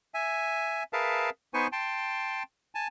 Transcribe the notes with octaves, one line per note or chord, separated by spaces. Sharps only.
E5 G#5
G#4 A#4 B4 E5 F5 A5
B3 D#4 B4 C5 G#5 C#6
G5 A5 C6
G#5 A5